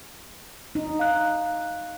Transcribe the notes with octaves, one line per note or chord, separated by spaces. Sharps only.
D#4
F5 F#6